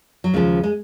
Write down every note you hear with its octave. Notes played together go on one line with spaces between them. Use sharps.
F#3
D#2 C#3 F3 G#3
G#3